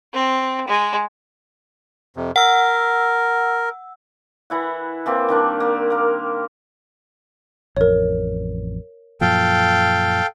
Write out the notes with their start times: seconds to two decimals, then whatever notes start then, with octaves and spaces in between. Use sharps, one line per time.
0.13 C4
0.68 G#3
2.16 F2 C3
2.36 A#4 F#5 E6
4.50 E3 E4 F#5
5.06 E3 A#3 C4
5.29 D#3 G3 D4
5.60 A#3
5.90 A#3 A#4
7.77 A1 F2 A#4 C#5
9.21 F#2 A#2 F3 A4 F5 G5